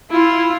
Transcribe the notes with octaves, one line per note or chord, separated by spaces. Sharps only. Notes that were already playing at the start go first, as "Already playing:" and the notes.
E4 F4